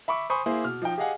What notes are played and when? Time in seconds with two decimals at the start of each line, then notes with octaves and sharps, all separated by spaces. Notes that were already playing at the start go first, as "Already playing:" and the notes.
0.08 E5 B5 C#6 D6
0.30 C5 G#5 B5 C#6 D#6
0.46 A#3 E4 G#4 C5
0.64 B2 F6
0.82 F3 D#4 D#5 G5
0.98 G4 G#4 D#5 F5 F#5 G#5